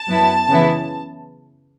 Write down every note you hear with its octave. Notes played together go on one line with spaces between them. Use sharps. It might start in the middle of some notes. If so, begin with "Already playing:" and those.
Already playing: A5
F#2 F#3 B3 E4
C#3 E3 B3 E4